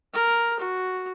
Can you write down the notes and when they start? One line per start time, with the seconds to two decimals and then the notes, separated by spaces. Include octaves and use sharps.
0.14 A#4
0.59 F#4